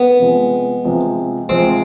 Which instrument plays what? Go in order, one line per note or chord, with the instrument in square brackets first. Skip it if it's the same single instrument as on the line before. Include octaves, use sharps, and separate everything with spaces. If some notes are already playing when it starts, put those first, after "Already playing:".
Already playing: [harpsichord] B3
[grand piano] C3 F3 G#3
C3 F3 G#3
[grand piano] C3 F3 G#3 [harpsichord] C4